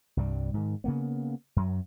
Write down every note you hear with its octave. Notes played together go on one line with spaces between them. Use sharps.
C2 G2 G3
G#2 D#3
C#3 A#3 B3
F#2 F#3